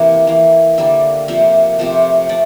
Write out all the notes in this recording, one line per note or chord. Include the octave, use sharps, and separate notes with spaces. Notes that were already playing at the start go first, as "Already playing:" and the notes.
Already playing: C3 E3 A#3 A#4
E3 A#3
D3 G3 A#3 E5
C3 F3 A#3 E5
C3 F3 A3
A3 D5